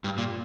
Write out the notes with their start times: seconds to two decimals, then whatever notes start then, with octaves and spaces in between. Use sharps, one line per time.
0.04 G2
0.18 A#2